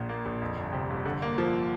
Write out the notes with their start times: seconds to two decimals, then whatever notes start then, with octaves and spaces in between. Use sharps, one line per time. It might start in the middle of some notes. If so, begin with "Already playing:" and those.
Already playing: A#1 A#2
0.09 A#3
0.26 A#1
0.41 F2
0.57 G1
0.73 C3
0.90 G1
1.05 D3
1.22 A#3
1.38 F3